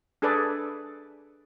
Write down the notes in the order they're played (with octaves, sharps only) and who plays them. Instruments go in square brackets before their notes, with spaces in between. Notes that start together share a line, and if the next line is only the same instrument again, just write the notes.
[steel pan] D4 G#4 A4 B4 D5